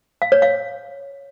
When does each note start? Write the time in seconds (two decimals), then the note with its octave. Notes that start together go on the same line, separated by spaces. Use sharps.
0.22 F5
0.32 C#5
0.42 F5